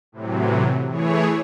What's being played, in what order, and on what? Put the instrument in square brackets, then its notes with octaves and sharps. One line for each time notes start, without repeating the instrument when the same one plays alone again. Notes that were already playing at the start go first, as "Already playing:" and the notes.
[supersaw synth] A2 C3 E3 F#3
E3 A3 E4 G#4 C#5